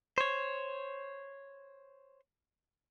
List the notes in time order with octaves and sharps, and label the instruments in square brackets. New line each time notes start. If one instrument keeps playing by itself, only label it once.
[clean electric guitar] C5 C#5